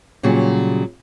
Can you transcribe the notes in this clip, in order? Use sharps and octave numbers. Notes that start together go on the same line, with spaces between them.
A#2 C#3 F#3 G3